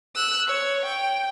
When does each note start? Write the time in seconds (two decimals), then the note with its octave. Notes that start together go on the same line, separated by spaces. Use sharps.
0.15 E6 F#6
0.47 C#5
0.85 G5